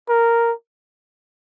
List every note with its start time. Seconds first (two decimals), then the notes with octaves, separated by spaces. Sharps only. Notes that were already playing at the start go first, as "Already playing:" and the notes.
0.09 A#4